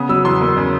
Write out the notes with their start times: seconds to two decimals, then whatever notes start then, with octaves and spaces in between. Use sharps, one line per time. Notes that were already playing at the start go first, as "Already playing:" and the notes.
Already playing: C#3 B3 D#6
0.09 F#3 E6
0.25 E2 C6
0.41 A#3
0.57 C#3